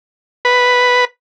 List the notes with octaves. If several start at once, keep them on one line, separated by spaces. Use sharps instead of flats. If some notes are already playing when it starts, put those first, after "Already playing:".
B4